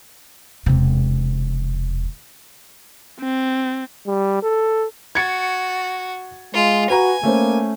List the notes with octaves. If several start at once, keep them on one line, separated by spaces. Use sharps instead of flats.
E1 C3
C4
G3
A4
F#4 G#6 A6 C#7
G#3 F4
F#4 B4 G#5 A#5
A3 A#3 C#4 C5